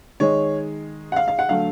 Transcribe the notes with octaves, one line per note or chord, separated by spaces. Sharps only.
D#3 G#3 C#5
F#5
F5
F5
F#5
D3 F#3 A3 F5